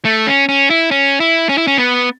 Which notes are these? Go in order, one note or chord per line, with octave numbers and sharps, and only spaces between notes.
A3
C#4
C#4
E4
C#4
E4
C#4
E4
C#4
B3